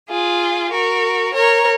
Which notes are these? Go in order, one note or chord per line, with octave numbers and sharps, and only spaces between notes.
F4 G#4
F#4 A#4
A#4 C#5